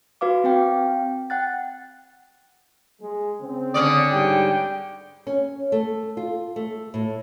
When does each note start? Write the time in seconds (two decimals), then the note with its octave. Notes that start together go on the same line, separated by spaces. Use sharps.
0.21 F#4 B4 F5 D6
0.44 C4 F5 G5
1.30 F#5 G5 F#6 A6
3.02 G#3
3.42 C#3 C4
3.74 D3 C#4 D5 D#6
4.10 G#2 G3 G5
5.27 C#4
5.72 A3
6.17 F4
6.56 A3
6.94 A2